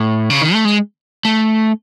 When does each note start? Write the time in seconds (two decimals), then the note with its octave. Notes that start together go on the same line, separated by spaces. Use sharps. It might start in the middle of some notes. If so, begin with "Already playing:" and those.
Already playing: A2
0.30 C#3
0.41 D#3
0.54 A3
0.65 G#3
1.25 A3